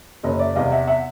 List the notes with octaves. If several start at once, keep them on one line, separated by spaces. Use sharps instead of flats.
F#1 C#5 D#5
D5 E5
E2 C3 D#5 F5
E5 F#5
E5 F#5